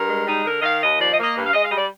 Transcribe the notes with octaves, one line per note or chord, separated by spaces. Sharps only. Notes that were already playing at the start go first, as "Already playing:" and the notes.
Already playing: G2 A#4
G#3
G3 D#4
D3 A#4
D#5
D#3 F5
D#2 D#5
F3 D5
D#5
A#3
D#5
G2
F5
G#3 D#5
F5
G3 D#5
D5